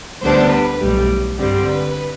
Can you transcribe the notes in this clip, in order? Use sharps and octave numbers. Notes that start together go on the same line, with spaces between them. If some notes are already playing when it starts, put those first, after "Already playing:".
D2 D3 G3 B3 D4 C5
B4
B1 A2 G3
G2 D3 G3 C4
B4